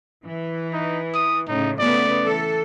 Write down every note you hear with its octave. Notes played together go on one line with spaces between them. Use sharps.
E3
D#4
D#6
A2 C#3 D#4
C#3 A3 B3 D5
E3 A4